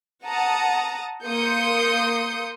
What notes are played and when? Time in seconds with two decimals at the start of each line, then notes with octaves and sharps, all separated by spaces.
0.24 F#5 A5 A#5 D#6
1.26 A#3 C6 D#6 G6 C#7